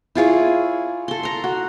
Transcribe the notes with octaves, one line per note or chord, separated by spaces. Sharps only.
E4 F4 G#4 C#5
A4 C6
A#5 C6
F#4